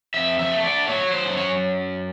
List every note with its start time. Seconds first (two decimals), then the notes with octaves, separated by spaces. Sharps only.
0.14 F2 E5
0.39 E5
0.51 A3
0.64 D5
0.88 F#3 C#5
1.12 C5
1.25 F#2
1.37 C#5